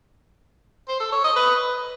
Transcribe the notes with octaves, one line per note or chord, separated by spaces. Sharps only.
C5
A4
C#5
D#5
B4